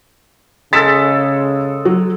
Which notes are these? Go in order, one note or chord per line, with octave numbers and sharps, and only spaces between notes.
C#3 G#3 A4 A6 B6 E7
F#3